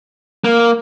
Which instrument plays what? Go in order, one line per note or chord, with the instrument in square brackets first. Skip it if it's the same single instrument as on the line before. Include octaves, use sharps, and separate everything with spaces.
[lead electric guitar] A#3